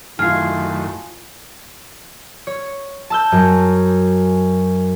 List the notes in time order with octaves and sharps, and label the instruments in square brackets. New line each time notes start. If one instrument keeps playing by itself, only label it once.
[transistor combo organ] F#2 D#3 A3 [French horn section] E4 [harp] F4 G#5 [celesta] F6 C7
[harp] C#5
A5 E6 G6
F#2